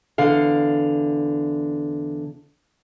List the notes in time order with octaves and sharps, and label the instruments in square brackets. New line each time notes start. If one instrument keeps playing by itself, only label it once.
[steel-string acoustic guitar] E2 D3 F5